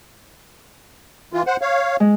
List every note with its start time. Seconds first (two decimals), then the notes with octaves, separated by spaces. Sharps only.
1.33 E3 F4
1.47 C5 F#5
1.61 C#5 F5
2.00 G#3